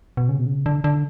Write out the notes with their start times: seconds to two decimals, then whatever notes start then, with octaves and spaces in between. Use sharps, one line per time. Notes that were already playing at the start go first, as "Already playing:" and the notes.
0.17 B2
0.29 C#3
0.39 B2
0.46 C#3
0.66 D3
0.84 D3